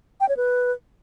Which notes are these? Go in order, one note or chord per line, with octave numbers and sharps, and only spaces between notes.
G5
C#5
B4